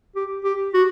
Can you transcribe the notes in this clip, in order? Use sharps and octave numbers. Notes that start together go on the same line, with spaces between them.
G4
G4
F#4